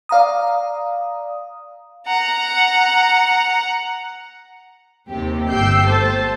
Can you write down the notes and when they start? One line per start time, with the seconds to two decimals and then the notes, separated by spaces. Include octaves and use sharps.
0.09 D5 F5 A#5 D#6
2.07 F#5 A#5
5.10 D#2 C3 C4 G4
5.49 G1 G4 G5 E6 G6 C7
5.86 A3 C5 A5